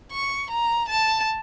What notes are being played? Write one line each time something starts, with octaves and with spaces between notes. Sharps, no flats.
C#6
A#5
A5